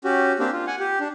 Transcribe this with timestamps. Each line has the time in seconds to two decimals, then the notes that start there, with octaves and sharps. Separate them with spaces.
0.04 C#4 F#4 G4
0.39 A#3 C4 D4 G4
0.53 F4
0.67 F#5 G#5
0.80 G4
1.01 D4